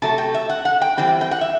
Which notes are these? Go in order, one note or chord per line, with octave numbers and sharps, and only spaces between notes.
C3 F#3 A3 A5
G5
E5
F#5
F#5
G5
E3 G3 C4 G5
G5
F#5
E5